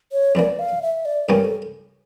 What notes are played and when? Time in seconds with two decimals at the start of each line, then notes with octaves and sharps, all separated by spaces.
0.12 C#5
0.35 F2 E3 A#3 D5
0.59 F5
0.82 E5
1.05 D5
1.29 G2 E3 A#3 C#4 G4 A#4
1.44 A4